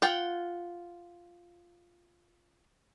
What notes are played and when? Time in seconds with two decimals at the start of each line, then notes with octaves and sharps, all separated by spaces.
0.02 F4 F#5 G5